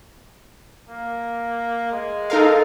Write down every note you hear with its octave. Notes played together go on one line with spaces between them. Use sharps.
A#3
G#3
D#4 A4 A#4 F5